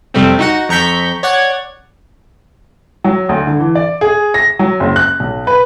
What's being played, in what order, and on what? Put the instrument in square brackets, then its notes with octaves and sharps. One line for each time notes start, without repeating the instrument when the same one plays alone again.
[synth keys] F2 C3 G3 A3 C4
D#4 F#4 F#5
F2 A#5 C#6 G6 B6
C#5 D5 F#5 G#6
[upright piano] F#3
D2
D3
E3
D5
G#4
A#6
F#3
F#1
F#6
B1
B4